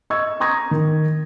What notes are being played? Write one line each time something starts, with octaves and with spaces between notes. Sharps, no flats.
D#5 C#6 E6 G#6
A#5 C#6 D#6 G#6 A#6
D#3